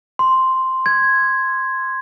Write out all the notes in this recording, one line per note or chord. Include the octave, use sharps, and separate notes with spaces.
C6
G#6